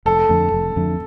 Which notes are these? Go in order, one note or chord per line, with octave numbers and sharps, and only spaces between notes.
F1 A4
F2 D3 A3
F1
F2 D3 A3